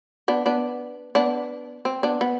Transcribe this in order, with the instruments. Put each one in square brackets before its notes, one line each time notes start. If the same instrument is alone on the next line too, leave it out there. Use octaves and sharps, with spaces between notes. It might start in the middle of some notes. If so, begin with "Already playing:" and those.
[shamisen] B3 D4
B3 D4
B3 D4
C4
B3 D4
B3